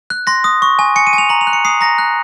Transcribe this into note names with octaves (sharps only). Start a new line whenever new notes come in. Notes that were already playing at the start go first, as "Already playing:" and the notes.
F#6
C6 A#6
D#6
C#6
G#5
G#5 C#7
D#7
G#5
F7
A#5 F#7
F7
F#6
C#7
D#6 C7
A#5 A#6
F#6